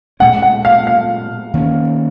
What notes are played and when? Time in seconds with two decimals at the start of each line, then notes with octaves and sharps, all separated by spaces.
0.20 A#2 G#3 C#4 F#5
0.42 F#5
0.65 F5
0.87 F5
1.54 D#3 A#3 C#4